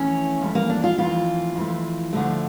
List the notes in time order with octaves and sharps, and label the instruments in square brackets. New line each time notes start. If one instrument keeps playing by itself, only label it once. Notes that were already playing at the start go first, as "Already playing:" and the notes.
Already playing: [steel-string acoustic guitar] F2 E3 A3 C#4
F2 E3 A3
A#3
D4
F4
F2 E3 A3 F4
F2 E3 A3
D2 D3 F3 A3